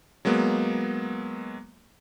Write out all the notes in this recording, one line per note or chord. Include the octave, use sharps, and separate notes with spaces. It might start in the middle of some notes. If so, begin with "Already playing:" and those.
F#3 G#3 A#3 B3